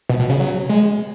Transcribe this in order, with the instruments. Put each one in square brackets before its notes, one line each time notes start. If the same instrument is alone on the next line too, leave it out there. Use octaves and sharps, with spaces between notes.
[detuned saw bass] B2
B2
C#3
F#3
G#3